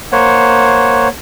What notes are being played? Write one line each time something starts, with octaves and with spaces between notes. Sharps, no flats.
A#3 C5 C#5 F#5